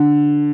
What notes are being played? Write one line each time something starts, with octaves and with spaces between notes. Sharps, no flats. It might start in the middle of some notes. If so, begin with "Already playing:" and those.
Already playing: D3